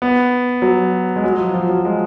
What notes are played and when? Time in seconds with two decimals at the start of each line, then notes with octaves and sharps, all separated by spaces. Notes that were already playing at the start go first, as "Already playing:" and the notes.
0.02 B3
0.62 F#3
1.16 G#3
1.24 F#3
1.39 F3
1.54 F3
1.69 F#3
1.85 G#3